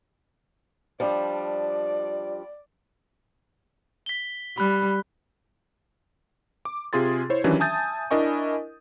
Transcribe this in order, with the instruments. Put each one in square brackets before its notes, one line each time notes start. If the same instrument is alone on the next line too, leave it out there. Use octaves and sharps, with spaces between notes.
[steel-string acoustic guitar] F3 G3 D4 [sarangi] D5
[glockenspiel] B6 G7
[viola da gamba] G3 [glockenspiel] B5 F#6
[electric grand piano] D6
C3 F4 G#4 C6 A6
E4 C5 C#5
D#3 E3 F#3 C#4 D4 G4
E5 G#5 A5 D#6 G6 A6
D4 E4 A#4 D#5 G#5 C#6